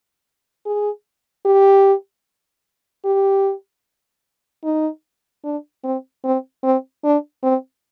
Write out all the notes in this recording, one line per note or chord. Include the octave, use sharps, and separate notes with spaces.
G#4
G4
G4
D#4
D4
C4
C4
C4
D4
C4